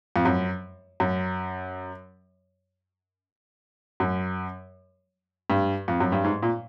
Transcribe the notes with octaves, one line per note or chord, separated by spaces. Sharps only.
F2
F#2
F#2
F#2
G2
F2
F#2
G2
G#2
A#2